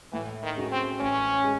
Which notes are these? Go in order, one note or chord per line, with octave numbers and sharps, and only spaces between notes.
A2 E3
D#3
G#3 C#4 F#4
C4
A1 C#4
G#3